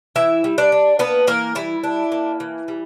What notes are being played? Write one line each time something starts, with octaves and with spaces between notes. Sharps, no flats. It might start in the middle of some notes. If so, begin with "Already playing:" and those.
E3 E4 E5
G3
D4 D5
D4
A#3 B3 B4
E3 A#3 A#4
G3 E4
D4
A#3
E3
G3